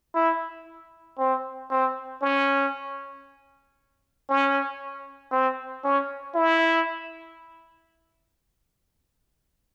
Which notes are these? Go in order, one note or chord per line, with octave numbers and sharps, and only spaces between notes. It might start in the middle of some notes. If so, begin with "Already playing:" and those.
E4
C4
C4
C#4
C#4
C4
C#4
E4